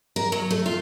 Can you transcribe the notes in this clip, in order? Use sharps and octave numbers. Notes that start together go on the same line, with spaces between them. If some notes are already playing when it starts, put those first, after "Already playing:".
A#4
F#3
A3
F4